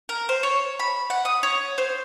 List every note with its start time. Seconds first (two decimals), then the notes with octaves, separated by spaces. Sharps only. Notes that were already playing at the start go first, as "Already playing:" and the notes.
0.09 A#4
0.29 C5
0.43 C#5
0.79 B5
1.10 F#5
1.25 D#6
1.43 C#5
1.78 C5